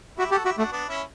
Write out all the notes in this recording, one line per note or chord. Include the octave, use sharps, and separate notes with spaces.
E4 F#4 G4
F#4 G4 A4
E4 F#4 G4
A3 D4 F#4
B3 D4
C#4 E4